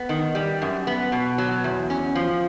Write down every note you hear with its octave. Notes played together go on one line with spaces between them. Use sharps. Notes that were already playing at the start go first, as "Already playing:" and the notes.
Already playing: B3
D#3
G3
F#2
B3
B2
F#3
E2
C#4
F3